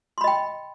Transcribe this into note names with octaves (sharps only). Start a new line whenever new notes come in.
D#5 G5 B5 C6